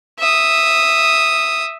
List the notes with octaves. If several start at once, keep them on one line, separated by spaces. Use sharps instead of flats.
E5 D#6